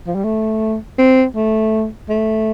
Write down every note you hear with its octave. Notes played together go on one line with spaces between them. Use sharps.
F3
G3
A3
C4
A3
A3